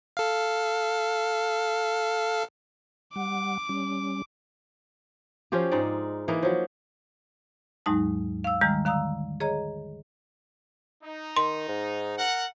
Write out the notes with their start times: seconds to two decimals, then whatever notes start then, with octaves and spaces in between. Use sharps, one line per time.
0.17 A4 F5
3.16 G3 F#5 D6
3.69 G3 C#4
5.52 F3 C#4 F4 G4
5.72 G#2 G#3 D#4 D5
6.28 E3 A#3 D#4
6.43 F3 F#3
7.86 D#2 G#2 F#3 G#3 D#4 A5
8.44 F5 E6
8.61 D#3 G3 G#3 A#5 F6
8.85 D3 F5 A#5 D#6 E6
9.40 G#4 C#5 D#5 A#5
11.03 D#4
11.37 D#3 C6
11.68 G#2
12.18 A#4 F#5